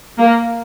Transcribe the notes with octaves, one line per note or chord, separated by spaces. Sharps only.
A#3